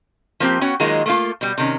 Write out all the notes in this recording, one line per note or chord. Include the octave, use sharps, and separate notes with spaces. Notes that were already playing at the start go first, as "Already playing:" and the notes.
F3 A#3 C4 G4
B3 C#4 F#4 C#5 G5
D#3 F#3 G#3 A#3 F4
A3 A#3 F4
B2 G3
C3 D#3 C#4